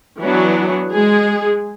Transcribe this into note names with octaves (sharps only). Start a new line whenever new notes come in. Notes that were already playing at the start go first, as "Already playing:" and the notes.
E3 F#3 B3 D4 F#4
G#3 G#4